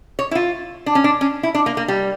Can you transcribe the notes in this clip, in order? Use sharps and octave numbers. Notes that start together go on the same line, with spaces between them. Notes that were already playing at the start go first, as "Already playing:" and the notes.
C#5
E4
F4
D4
C#4
D4
C#4
E4
D4
A#3
A#3
G3